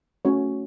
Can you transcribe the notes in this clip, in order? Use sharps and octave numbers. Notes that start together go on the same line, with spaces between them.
A3 C#4 F#4 C#5